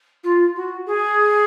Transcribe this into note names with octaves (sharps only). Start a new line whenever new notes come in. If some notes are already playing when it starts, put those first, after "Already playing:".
F4
F#4
G#4